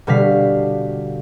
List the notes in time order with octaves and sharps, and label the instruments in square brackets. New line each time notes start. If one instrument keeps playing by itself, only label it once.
[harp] B2 D3 G3 F#4 F5 B6